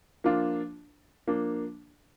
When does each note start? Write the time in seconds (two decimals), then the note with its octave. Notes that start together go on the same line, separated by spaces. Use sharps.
0.24 F3 A#3 D4 F4
1.27 F3 A#3 D4